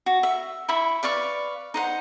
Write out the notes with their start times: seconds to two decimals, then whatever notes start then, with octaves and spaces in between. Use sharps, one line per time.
0.06 F#4
0.23 E5
0.68 E4 E5 B5 C#6
1.03 B4 D5 F5 C#6
1.74 D#4 C5 F#5